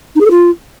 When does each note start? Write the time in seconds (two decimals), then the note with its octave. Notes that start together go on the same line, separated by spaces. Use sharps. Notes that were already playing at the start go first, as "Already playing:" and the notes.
0.16 D#4
0.21 G#4
0.26 A4
0.31 F4